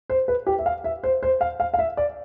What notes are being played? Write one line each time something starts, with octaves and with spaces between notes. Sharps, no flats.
C5
B4
G4
E5
F5
E5
C5
C5
F5
F5
F5
E5
D5